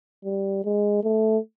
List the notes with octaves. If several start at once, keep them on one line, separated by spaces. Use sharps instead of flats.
G3
G#3
A3